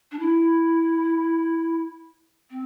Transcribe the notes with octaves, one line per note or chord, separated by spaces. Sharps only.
D4
E4
C4